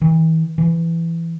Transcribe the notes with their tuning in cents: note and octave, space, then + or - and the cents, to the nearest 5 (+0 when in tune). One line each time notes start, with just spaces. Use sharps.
E3 -40
E3 +15